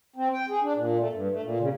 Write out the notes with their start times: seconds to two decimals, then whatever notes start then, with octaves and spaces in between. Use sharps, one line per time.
0.16 C4
0.34 G5
0.49 G#4
0.63 D4
0.75 A#2
0.98 A3
1.13 G2
1.31 A3
1.42 A#2
1.60 C#3